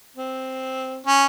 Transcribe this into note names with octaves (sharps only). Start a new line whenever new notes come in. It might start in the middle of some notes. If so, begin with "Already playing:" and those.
C4
C#4